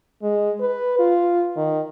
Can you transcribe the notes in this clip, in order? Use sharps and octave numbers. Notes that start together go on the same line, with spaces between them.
G#3
B4
F4
D#3